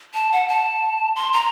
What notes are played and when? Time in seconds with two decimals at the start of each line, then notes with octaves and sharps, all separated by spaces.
0.14 A5
0.32 F#5
0.48 A5
1.16 C6
1.33 A#5